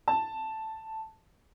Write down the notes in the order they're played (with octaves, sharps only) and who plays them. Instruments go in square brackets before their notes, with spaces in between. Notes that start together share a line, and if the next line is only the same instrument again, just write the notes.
[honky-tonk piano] A5